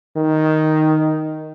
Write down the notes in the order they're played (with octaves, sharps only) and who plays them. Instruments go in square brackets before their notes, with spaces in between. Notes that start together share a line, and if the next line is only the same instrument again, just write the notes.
[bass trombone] D#3